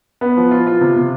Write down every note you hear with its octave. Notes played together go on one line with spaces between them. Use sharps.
B3
F3
F4
F4
C3
C3